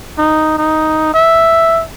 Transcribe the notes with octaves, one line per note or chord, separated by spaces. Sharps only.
D#4
D#4
E5